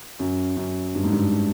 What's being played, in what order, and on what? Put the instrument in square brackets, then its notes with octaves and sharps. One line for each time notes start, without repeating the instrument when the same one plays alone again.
[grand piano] F#2
F#2
G2
G#2
G2